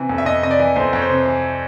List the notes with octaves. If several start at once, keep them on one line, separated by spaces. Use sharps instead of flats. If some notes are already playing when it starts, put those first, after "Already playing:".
Already playing: C3 E3
F2
E5
F2 D#5
C3 D#5
D5
E3
F2 C5
F2 C#5
C5
C3
E3